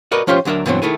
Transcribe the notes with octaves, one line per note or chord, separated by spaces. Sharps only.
F#4 A#4 B4 D5 D#5
F3 C#4 F4 G4 C5
D2 F#3 D4 A#4 E5
G2 B2 E3 F#3 C4
D#3 A3 E4 G#4